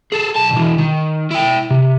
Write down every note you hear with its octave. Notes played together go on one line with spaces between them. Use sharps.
G#4 A4
B1 A5
B2 E3
D#3
E4 G5
C3